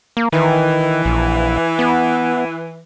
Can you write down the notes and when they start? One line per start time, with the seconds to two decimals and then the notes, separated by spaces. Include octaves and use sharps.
0.17 A#3
0.32 D#3 E3
1.05 A#1
1.79 B3